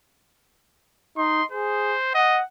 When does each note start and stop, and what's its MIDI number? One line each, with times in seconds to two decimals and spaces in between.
1.17 1.42 63
1.17 1.45 84
1.52 1.95 68
1.52 2.11 72
2.14 2.41 75
2.14 2.42 78